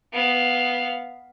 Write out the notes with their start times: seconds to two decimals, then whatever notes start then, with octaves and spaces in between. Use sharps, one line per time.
0.13 B3 F5